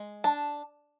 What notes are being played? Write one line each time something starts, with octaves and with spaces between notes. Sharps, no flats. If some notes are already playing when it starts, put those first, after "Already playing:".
Already playing: G#3
D4 A5